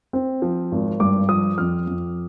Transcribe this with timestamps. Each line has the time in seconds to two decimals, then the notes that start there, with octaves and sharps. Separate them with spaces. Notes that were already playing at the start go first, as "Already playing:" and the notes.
0.13 C4
0.42 F3
0.72 G#1
1.00 G2 D6
1.29 F3 D#6
1.58 F2 F6
1.87 F2